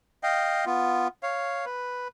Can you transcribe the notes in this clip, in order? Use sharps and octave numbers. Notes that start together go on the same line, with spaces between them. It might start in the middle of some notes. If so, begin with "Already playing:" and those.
D#5 F5 G5
B3 F4
C#5 F5
B4